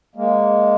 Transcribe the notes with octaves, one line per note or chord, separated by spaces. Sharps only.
G#3 A#3